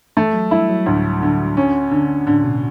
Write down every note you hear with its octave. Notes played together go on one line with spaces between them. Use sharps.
E3 A3
F#3
G3 E4
F#3
D2 A2
D3
C#4
D3
A2 D3
B2